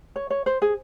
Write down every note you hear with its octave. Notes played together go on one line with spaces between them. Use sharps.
C#5
C#5
C5
G#4